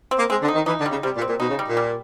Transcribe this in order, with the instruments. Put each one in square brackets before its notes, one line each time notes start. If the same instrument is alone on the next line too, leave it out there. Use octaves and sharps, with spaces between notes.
[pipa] C4
[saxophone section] A#3
[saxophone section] G#3 [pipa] C4
[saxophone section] D3
[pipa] D#4
[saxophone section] D#3
[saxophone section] E3 [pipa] D#4
[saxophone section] D3
[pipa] G3
[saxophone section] C#3
[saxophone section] C3 [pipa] G3
[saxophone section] A#2
[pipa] C4
[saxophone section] A#2
[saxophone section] B2 [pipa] D#4
[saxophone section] C#3
[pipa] G3
[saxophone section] A#2
[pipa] G3